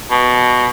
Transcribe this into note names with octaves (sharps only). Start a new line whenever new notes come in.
B2